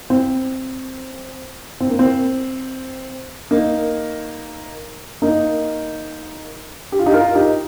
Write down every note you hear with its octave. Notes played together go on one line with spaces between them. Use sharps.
C4
C4
A#3
C4
A#3 D#4
A#3 D#4
G4
F4
D#4 G4
F4 A#4
D#4 G4